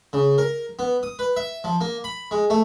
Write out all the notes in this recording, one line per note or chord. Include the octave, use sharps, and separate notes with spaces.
C#3
A#4
B3
D#6
B4
E5
F3
A#3
B5
G#3
A3